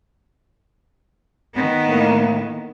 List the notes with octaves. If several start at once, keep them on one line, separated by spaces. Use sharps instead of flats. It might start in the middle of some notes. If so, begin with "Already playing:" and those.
D#3 B3
A2 A#3